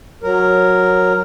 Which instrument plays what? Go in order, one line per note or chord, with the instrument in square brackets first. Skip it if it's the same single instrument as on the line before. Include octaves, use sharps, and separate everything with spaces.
[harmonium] F#3 A#4